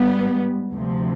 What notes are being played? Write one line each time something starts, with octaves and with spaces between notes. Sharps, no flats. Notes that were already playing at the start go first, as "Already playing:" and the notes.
Already playing: G#2 G3 B3
D2 C3 F3